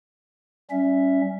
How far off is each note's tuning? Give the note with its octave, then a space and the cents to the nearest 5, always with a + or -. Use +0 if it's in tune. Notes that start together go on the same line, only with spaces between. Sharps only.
G3 -25 C#4 +0 E5 +0